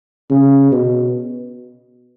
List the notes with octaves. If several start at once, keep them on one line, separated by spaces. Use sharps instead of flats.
C#3
B2